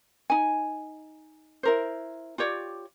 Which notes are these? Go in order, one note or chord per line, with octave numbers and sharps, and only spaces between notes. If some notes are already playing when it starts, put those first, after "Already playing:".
D#4 G#5
E4 A#4 C5
F4 G4 C#5 D5